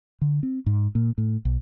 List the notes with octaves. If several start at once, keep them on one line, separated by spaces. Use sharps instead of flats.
D3
C4
G#2
A#2
A2
B1